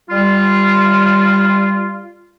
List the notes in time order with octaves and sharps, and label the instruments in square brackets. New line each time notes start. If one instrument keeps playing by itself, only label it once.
[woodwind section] G3 F4